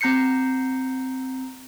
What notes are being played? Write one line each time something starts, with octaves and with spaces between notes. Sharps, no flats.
C4 A#5 G6 C7 C#7